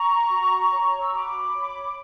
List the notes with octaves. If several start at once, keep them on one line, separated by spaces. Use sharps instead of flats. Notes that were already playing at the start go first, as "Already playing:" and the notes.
Already playing: A#5 C#6
F#4
C#5
E6
F#4 B5 D6
C#5